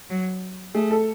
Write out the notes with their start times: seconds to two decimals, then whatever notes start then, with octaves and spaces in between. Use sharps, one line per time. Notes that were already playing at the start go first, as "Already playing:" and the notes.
0.10 F#3
0.74 A3 G#4
0.91 A4